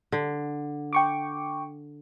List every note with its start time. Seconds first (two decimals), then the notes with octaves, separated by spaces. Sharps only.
0.12 D3
0.93 G5 C#6 D6